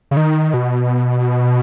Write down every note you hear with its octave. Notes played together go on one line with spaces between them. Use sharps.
C#3
D#3
B2